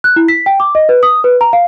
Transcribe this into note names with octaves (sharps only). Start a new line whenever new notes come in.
F#6
E4
B6
G5
D6
D#5
B4
D#6
B4
A#5
F5